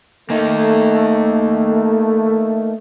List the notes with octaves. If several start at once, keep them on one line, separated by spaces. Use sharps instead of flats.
A3 A#3 D#4